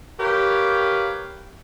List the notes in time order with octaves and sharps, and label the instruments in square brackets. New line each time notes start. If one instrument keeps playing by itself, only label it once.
[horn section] G4 A#4 B4 C#5 F5